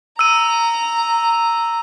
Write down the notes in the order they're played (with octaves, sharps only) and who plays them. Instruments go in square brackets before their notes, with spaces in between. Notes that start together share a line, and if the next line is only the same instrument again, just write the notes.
[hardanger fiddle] A#5 [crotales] E6 D#7